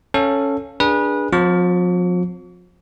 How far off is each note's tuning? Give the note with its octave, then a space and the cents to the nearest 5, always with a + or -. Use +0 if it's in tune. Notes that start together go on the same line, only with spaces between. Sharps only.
C#4 +0 A4 +5 F5 +0
D4 +0 G#4 -15 B4 -25
F3 +40 C4 -15 C#6 +45